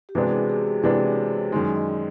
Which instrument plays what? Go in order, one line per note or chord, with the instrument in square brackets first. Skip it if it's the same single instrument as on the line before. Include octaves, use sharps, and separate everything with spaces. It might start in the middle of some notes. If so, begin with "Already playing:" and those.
[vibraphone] G4
[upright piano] C3 E3 G#3 B3 D4 [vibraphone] F#4
[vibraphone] G#4
G#4
G4
[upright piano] C3 E3 G#3 B3 D4 [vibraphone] B4
[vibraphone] C#5
C5
C5
[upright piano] F#2 D#3 G#3 [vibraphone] D5
[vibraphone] D#5